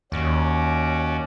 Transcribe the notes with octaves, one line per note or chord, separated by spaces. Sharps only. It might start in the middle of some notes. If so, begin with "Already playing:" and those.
D#2 C#4 F#4 D5